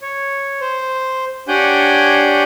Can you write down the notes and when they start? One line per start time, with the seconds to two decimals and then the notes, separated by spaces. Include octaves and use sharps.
0.02 C#5
0.61 C5
1.48 D4 G4 C#5 F#5 G#5 G6